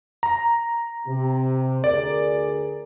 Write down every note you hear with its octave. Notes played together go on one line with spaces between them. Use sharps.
A#5
C3
D2 G#4 A#4 D5